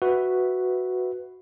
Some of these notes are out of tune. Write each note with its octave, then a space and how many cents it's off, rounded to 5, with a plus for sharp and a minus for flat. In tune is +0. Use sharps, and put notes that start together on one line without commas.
F#4 +0 B4 +5 E5 -10